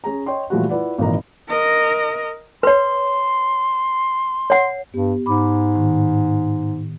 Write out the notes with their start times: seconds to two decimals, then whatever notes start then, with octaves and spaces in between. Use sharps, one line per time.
0.04 C#4 G#4 A#5
0.26 C#5 D#5 G5 C6
0.50 A#2 E3 F3 G3 A3 F#4
0.69 E4 F4 B4 D5 F#5
0.98 G#1 A#2 D#3 E3 A#4 A#5
1.49 A#4 D#5
2.63 B4 C#5 C6
4.50 C#5 F#5
4.94 G2 B3 G4
5.26 G#2 B5 D6
5.76 A2 D#3